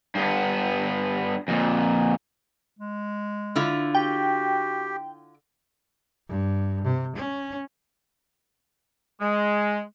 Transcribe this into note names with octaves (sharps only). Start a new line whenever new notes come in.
G2 B3
F2 A#2
G#3
D3 E4 F4
F#4 G4 G5
G2
C3
C#4
G#3